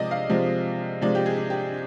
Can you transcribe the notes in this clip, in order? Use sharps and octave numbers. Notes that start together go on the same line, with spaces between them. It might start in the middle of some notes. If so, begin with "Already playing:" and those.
Already playing: C3 F3 G#3 D5 D#5
F5
C3 F3 G#3
C3 F3 G#3 D5
G4
G#4
G4